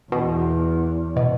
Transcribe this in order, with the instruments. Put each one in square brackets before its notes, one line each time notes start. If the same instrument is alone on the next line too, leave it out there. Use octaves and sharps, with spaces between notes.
[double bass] E2 [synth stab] B2
[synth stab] B2